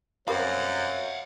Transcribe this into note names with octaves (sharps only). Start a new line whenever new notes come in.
F#2 G3 A#3 C4 C#5 F5 F#5